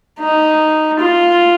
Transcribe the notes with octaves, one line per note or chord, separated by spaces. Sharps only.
D#4
F4